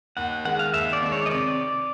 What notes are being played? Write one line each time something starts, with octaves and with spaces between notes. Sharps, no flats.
D#2 F#5
D#3 G#3 F#5
F5
D#2 E5
D5
D#3 G#3
C#5
D#5
C3 D5